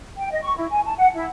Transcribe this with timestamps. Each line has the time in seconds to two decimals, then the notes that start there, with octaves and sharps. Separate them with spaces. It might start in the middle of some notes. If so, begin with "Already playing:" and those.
0.18 G5
0.31 D#5
0.43 C#6
0.57 E4
0.71 G#5
0.85 A5
0.97 F#5
1.14 E4